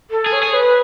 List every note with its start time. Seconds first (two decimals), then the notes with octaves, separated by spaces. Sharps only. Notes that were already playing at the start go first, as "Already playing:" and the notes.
0.11 A4
0.26 G#4
0.33 C#5
0.43 G#4
0.54 B4